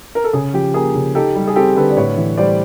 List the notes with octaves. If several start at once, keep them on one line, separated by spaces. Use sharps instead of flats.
A#4
A4
C#3 G#4
F3 G4
A#3 G#4
C#3
D#4 G4 A4
G3
G#4
C4 G4 A4
D3 A4 B4
D5
A2 B4 C#5
E3
G3 C5 D5